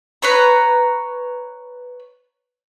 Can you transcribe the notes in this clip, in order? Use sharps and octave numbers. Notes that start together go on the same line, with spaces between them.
B4 C#5 A#5